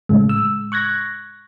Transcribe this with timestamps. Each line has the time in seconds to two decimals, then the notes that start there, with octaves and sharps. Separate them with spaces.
0.09 A2 C#3 G#3
0.29 E6
0.72 C#6 F#6 G#6 A#6